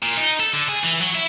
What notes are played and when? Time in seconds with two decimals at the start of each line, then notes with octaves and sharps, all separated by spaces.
0.03 A#2
0.17 D#4
0.40 A4
0.53 D3
0.68 G#4
0.84 E3
1.01 F#3
1.15 E4